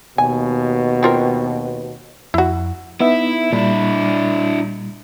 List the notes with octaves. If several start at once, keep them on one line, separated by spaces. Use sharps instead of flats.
D#2 B2 G#5
C4 F4 A#4
F2 E4 F#4
B3 D#4 E4 E5
A#2 G3 D4 E4